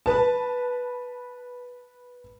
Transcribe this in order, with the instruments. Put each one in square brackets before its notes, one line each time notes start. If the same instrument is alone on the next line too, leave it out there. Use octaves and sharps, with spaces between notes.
[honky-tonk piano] B4 A5